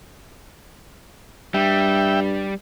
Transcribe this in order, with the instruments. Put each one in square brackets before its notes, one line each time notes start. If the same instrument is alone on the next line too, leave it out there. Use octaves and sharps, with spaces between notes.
[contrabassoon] G2 [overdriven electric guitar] G3 [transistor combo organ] E5 G5